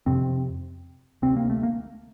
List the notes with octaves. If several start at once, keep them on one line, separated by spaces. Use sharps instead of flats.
F2 C3 C4
D2 C3 C4
A#3
A3
A#3